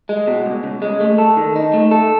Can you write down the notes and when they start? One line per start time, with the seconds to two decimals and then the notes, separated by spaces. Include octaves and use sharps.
0.09 G#3
0.27 B2
0.46 C#2
0.64 C#2
0.82 G#3
1.00 A3
1.18 A4
1.37 D#3
1.56 D#4
1.73 A3
1.91 A4